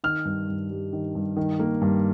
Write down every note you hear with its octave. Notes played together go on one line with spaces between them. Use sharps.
D#3 F6
G2
G2
G3
D#3
G2
D#3
A#3
G2